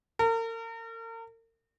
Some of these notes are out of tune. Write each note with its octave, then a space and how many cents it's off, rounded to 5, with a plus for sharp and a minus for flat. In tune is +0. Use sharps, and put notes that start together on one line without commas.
A#4 -40